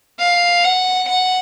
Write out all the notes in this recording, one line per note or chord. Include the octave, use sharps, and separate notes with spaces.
F5
F#5
F#5